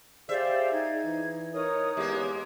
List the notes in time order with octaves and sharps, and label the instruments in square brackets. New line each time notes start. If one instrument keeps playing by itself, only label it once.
[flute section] G4 D5 F5 [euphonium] G#4 [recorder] C5 [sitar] E5
[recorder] D#4 [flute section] G#6
[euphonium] E3
[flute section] D#4 C#5 D#6 [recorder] A#4
[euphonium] E2 [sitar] G#3 A#3 [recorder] G4